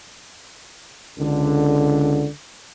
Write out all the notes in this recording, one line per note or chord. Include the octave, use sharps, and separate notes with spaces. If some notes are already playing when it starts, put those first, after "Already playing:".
C#2 D3